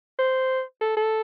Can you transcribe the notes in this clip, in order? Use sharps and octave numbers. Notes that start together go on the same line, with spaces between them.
C5
A4
A4